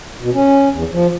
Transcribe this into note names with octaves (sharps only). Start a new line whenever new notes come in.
B2
C#4
E2
F3